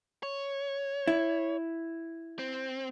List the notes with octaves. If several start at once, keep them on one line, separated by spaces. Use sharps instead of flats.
C#5
E4
C4